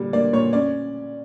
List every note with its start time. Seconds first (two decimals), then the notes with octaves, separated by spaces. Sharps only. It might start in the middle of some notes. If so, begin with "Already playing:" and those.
Already playing: A#2 D3 G3
0.13 A#3 D5
0.33 A#2 C#5
0.53 C#4 D5